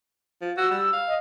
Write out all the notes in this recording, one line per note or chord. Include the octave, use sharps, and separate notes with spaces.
F3
F#4 E6
G3
F5
D#5